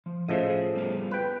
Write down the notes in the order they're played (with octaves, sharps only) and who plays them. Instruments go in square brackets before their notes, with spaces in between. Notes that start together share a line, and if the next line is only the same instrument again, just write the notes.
[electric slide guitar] F3
[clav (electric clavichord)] A2 C#3 F3 [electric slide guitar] D#5 E5
[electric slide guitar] G#4
G3 B3 F4
[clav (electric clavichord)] B4 G5